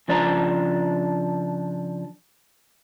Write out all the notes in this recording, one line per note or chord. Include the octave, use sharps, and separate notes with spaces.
C#3 F3 D4 C5 D5 A#5